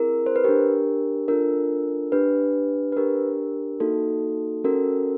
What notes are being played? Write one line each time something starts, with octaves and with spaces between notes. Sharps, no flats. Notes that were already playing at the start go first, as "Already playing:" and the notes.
Already playing: C4 E4 G#4 A#4
C5
B4
D4 G4 A#4
D4 F4 A4 A#4
D4 G4 B4
B4
D4 G4 A#4
A#3 D#4 F#4 A4
C#4 F#4 A4 A#4